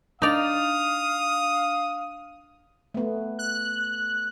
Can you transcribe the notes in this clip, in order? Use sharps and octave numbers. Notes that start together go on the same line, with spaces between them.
D4 D#4 D5 F5 D#6 F7
A3 B3
F#6